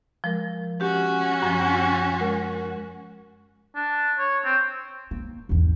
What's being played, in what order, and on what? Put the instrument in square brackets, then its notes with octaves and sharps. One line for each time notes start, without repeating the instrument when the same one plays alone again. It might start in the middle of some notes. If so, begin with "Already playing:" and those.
[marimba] F3 G#3 A#4
[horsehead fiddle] C#4 F#4 [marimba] G4
[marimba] F#2 F3
G#3 A#4 G#5
[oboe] D4
C#5
C4
[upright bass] A#3
G#1 E2